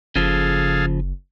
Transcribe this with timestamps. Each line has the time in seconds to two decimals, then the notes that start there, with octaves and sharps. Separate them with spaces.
0.16 F#1 C#3 F3 G#4 A4 F5